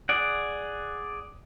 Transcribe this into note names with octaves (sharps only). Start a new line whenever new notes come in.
G#4 D5 F#5